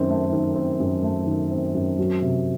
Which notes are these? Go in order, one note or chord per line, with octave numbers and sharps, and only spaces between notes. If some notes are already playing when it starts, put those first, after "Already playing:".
Already playing: F#2 D#3 C4
A3
D#3
C4
F#2
A3
D#3
C4
F#2
F#3
C3